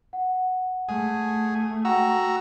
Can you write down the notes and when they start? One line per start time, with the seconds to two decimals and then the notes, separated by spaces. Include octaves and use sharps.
0.13 F#5
0.89 A3 G#4
1.85 F#4 F#5 G5 A#5 E6